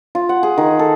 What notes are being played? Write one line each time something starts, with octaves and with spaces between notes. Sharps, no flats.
F4
F#5
G#4
D#3
A4